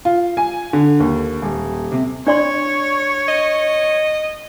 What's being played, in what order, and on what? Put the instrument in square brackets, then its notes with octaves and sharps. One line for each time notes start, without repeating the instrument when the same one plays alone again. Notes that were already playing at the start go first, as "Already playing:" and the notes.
[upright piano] F4
G#5
D3
D#2
D#1
C3
[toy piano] D4 D5 C6 [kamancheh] C#5
[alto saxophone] D#5